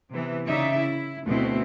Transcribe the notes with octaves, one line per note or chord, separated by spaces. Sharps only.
C3 E3 B3
C#3 D#4 D5 E5
E4
D2 B2 A3 C4 E4